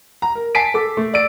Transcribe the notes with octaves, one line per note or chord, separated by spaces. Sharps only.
A#5
A#4
G#5 A5 B6 C7 D7
A4 D6
A3
D5 E6 D7